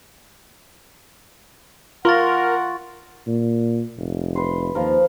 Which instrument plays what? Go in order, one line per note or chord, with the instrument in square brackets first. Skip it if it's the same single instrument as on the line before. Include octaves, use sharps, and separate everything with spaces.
[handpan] F4 [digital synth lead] A#4 [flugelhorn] F#5 [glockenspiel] C6 C#6 A6
[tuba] A#2
F1
[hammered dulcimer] B4 C6
[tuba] D#2 [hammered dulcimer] F3 A#4